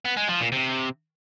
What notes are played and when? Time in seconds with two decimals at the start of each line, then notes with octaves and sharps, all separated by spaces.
0.05 B3
0.17 G#3
0.29 F3
0.40 A#2
0.52 C3